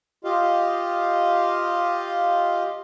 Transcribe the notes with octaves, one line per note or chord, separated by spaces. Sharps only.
F4 G4 D#5 F5